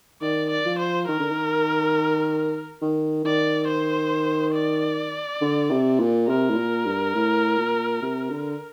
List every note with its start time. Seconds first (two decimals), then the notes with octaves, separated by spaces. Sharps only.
0.21 D#3 D5
0.51 D5
0.65 F3
0.79 C5
1.08 D#3 A#4
1.20 D3
1.31 D#3
2.82 D#3
3.25 D#3 D5
3.68 C5
4.55 D5
5.41 D3
5.71 C3
6.00 A#2
6.28 C3 A#4
6.50 A2
6.57 A#2
6.85 G2
7.15 A2
7.58 A#2
8.02 C3
8.30 D3